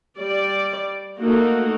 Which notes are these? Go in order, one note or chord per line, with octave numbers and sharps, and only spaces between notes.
G3 D5
A3 A#3 D#4 F#4 A4